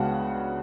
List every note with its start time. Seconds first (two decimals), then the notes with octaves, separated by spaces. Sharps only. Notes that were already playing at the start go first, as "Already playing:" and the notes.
Already playing: C#2 C#3 G#3 B3 D4 F#4 F#5 A5